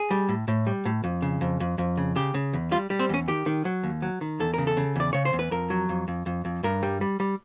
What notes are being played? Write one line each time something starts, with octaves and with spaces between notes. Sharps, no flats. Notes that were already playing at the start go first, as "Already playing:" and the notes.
Already playing: G#4
G3
A2
A2
G3
A2
F2
C#3
F2
F2
F2
C#3
C#3 G4
C#3
E2
G3 F4
G3
C4
E2 C#4
D#3 G4
D#3
F#3
D#2
F#3
D#3
E2 A4
C#3 A#4
A4
C#3
E2 D5
C#3 C#5
C5
E2
B4
F2 A#4
F#3
F2
F2
F2
F2
G2 A#4
G3
G3
G3